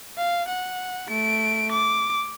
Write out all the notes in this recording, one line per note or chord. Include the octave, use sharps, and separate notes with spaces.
F5
F#5
A3 D7
D6